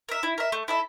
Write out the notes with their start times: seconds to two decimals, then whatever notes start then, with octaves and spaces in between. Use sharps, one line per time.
0.09 A#4 E5
0.23 E4
0.38 A#4 E5
0.52 A3
0.68 E4 A4 E5